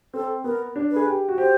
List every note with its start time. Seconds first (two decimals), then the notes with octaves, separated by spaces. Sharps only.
0.14 C4 A4
0.44 B3 A#4
0.76 D4
0.91 G#4 B4
1.06 G4
1.29 F#4
1.38 G4 C5